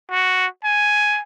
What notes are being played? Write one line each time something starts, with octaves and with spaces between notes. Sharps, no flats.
F#4
G#5